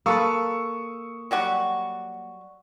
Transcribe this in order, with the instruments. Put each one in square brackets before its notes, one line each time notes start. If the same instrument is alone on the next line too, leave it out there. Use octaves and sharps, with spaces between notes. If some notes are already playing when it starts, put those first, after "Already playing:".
[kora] A#3 A4 B4 [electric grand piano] C#6 D#6 E6
[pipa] F#3 G3 F#4